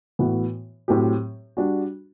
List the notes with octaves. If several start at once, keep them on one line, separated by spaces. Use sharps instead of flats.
A2 E3 B3 F#4
A2 F#3 C4 G4
G3 D4 F#4